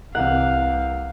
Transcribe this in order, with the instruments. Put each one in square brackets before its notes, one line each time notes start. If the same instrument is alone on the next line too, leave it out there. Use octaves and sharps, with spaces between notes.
[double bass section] C2 [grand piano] C3 E3 A#4 [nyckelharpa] F5 [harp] F#5